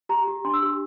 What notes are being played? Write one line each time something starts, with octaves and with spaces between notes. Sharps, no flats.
G4 A#5
G4
D4 C6
E6
G4